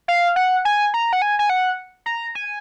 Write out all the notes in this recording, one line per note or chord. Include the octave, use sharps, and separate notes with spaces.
F5
F#5
G#5
A#5
F#5
G#5
G#5
F#5
A#5
G#5